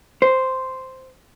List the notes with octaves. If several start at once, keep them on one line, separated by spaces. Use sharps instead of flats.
C5